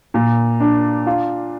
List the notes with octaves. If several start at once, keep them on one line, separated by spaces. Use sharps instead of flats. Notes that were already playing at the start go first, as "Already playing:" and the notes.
A#2
D4
F4